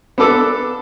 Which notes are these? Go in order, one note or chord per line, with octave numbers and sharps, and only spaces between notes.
B3 D4 A4 D6 E6